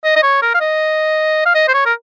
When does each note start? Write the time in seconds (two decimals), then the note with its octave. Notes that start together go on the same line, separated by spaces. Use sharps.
0.04 D#5
0.16 D#5
0.23 C#5
0.42 A#4
0.54 F5
0.61 D#5
1.46 F5
1.55 D#5
1.68 C5
1.74 C#5
1.86 A#4